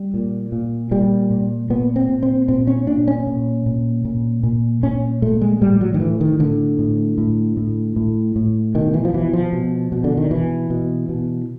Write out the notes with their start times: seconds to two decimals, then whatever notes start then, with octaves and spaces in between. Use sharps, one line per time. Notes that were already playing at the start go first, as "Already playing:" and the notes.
Already playing: G3
0.14 A#2
0.52 A#2
0.91 A#2 G3
1.30 A#2
1.70 A#2 B3
1.96 C4
2.09 A#2
2.23 C4
2.48 A#2 C4
2.67 C#4
2.87 A#2 D4
3.08 C#4
3.27 A#2
3.66 A#2
4.05 A#2
4.43 A#2
4.83 A#2 C#4
5.22 A#2 A3
5.42 G#3
5.61 A2 G3
5.81 F#3
5.94 D#3
6.00 A2 E3
6.21 D#3
6.39 A2 D3
6.79 A2
7.18 A2
7.57 A2
7.96 A2
8.36 A2
8.75 B2 D#3
8.94 E3
9.05 F3
9.14 B2 E3
9.33 F3
9.53 B2
9.92 B2
10.04 D3
10.17 D#3
10.31 B2 E3
10.70 B2
11.09 B2